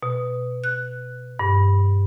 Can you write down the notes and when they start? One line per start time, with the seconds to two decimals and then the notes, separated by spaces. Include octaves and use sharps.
0.03 B2
0.64 F#6
1.39 G2